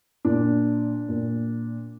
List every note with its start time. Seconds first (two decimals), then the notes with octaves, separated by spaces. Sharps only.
0.25 A#2 D4
1.09 A#2